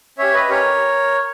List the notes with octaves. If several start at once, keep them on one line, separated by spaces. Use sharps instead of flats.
C#4 G4 C#5 E5
B4 D#5
C#4 G4 A#4 C#5